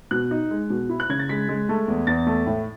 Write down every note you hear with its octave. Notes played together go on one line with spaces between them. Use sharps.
B2 F#6
D#4
G#3
B2
E4
F#6
C#3 G#6
A6
G#3 B6
G#3
A3
E2
E2 A6
A3
A2